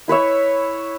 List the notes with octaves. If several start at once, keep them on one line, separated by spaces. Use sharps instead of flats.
E4 B4 C#5 E5